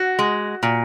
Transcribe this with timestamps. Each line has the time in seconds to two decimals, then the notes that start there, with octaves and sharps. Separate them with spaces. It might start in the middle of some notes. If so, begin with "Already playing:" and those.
Already playing: F#4
0.19 G#3
0.63 A#2